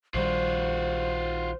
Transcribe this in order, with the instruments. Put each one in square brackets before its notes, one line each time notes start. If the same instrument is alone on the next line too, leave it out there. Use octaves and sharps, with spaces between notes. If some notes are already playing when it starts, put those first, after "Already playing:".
[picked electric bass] A#1 D#3 G3 [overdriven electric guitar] F4 F#4 [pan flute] C5